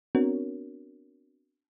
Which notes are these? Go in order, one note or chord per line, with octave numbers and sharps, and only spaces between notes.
B3 C4 D4 F#4 A#4 C#5